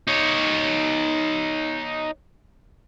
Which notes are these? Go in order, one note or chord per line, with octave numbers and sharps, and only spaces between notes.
D#4 C#5